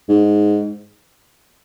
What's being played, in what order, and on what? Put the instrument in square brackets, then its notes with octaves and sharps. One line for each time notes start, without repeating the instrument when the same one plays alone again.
[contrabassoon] G#2